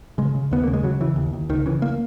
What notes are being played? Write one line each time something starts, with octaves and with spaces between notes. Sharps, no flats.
C#3 G#3
C#3
D#2 B3
C#3 A#3
G#3
C#3 F#3
C#3 E3
D#2
D#2
C#2 D#3
C#3 E3
A#3